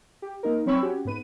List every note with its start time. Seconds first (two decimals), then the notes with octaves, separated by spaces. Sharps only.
0.22 G4
0.43 A#3 D#4 A#4
0.66 F#3 C4 C#5 B5 C#6 E6
0.82 C#4 F#4 G4 C#5
1.05 G#2 B3 B4 D#7